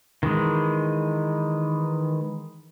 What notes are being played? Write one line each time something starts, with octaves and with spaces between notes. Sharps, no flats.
D#3 E3 G#3